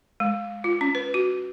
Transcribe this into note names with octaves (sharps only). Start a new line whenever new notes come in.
G#3
F4
C#4
B4
F#4